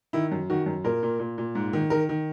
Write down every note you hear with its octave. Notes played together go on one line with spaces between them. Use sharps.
D#3 E4
F#2
D#3 F#4
F#2
A#2 A#4
A#2
A#2
A#2
G#2
D#3
D#3 A#4
D#3